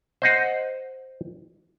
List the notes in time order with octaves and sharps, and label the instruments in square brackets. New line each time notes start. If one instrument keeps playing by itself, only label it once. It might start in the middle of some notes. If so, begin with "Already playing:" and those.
[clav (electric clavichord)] C5 D#5 F#5